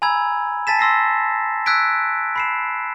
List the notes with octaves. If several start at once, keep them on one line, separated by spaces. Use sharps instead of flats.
G#5 A#5 B5 E6 G#6
G#5 A5 A6 B6 E7
C6 E6 A#6 C7
E6 F#6 G#6 B6 D7
B5 C7 E7